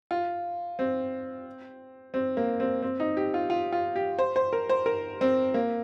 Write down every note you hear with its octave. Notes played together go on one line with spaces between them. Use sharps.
F4
C4
C4
A#3
C4
C4
D#4
G4
F4
F4
F4
G4
C5
C5
A#4
C5
A#4
C4
A#3